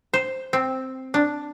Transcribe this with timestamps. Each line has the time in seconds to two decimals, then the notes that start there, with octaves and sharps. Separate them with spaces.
0.14 C5
0.53 C4
1.14 D4